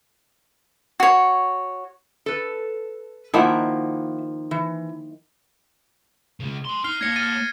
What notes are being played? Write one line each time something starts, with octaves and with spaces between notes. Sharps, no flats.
F#4 C#5
A4 B4
D#3 F3 A#3 E4 E5 F#5
E3
C#3 G#3
G#5 C6
D#4 F6 C7 G7
A#3 C#5 G#6 A#6 C#7
F6 A6 D#7